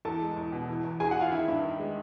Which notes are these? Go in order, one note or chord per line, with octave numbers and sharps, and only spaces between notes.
E2 A4 A5
G#3
E2
B2
E3
E2
E2 G#4 G#5
F#4 F#5
E2 F4 F5
D#3 E4 E5
G2
D#3
G#3